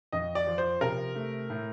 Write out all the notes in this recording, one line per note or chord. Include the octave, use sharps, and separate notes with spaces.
F2 D#5
D5
F3
C5
C3 A#4
A3
A2